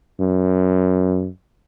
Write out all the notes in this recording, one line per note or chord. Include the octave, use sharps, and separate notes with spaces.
F#2